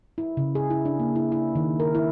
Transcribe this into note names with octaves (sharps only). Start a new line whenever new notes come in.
E4
C#3
G#4
E4
D4
A#3
E4
E4
D#3
A#4
E4